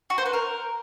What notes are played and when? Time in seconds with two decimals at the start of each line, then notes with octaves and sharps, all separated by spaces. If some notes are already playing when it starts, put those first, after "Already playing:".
0.10 F#4
0.18 C5
0.26 B4
0.33 A#4